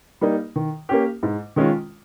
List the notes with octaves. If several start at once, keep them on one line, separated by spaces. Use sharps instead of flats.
G3 A#3 D#4
D#3
A#3 C#4 G4
G#2
D#3 G#3 C#4 F4